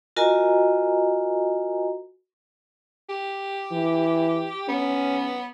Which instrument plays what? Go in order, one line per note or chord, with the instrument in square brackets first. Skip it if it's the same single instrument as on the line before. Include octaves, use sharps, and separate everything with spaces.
[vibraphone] F4 F#4 A#4 D#5 G#5 A#5
[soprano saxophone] G4
[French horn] E3
[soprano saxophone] B3 [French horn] C#4